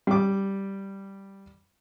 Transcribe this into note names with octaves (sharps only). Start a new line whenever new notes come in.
G3 D6